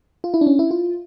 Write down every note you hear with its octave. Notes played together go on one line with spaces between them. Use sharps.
F4
E4
D4
C#4
E4
F4